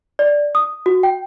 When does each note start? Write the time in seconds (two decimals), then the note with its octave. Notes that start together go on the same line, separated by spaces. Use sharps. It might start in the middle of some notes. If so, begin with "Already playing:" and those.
0.19 D5
0.55 D#6
0.86 F#4
1.03 G5